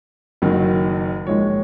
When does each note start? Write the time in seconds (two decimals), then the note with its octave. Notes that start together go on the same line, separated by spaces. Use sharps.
0.42 F#1 F#2 D#3 F#3
1.27 A#1 G#2 D#3 G#3 C#5